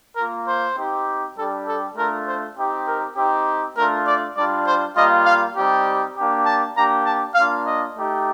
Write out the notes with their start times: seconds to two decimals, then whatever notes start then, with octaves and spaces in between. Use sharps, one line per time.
0.16 A#3 F4 A#4
0.47 C5
0.76 C4 D#4 G4
1.37 G3 D4 G4 A4
1.67 A4
1.96 A3 D4 F4 A#4
2.27 C5
2.56 C4 D#4 G4
2.87 A#4
3.16 C4 D#4 G4
3.76 A3 D4 F4 A#4
4.06 D5
4.36 G3 D4 F4 D5
4.66 C5
4.97 G3 A#3 F4 D#5
5.25 F5
5.56 G3 C4 D#4 G4
6.15 A#3 D4 G4
6.46 A5
6.76 A#3 D4 G4 A#5
7.05 A5
7.35 A#3 D4 F4 F5
7.66 D#5
7.96 A3 D#4 G4